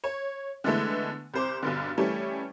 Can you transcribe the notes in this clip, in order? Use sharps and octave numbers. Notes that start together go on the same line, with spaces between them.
C#5
D3 E3 G#3 A3 B3
C2 C5 D6
B1 G2 D3
E3 G3 A3 C#4